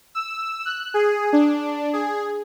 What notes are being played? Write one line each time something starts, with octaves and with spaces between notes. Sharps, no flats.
E6
F#6
G#4
D4
G#4